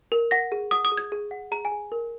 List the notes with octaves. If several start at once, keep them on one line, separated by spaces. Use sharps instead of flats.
A#4
F#5 A#6
G#4
F#5 D#6
D#6
G#4
G#6
G#4
F#5
G#4 A#5
G#5
G#4
A#4